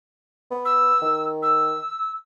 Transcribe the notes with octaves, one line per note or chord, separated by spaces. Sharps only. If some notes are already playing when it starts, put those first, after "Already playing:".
B3
E6
D#3
E6